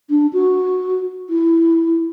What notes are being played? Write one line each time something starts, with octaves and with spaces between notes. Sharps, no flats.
D4
F#4
E4